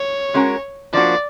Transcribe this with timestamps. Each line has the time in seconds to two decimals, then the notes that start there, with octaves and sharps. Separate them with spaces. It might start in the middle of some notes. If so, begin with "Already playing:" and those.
Already playing: C#5
0.34 G#3 C#4 F#4 A#4
0.93 F3 A#3 D4 F#4 D5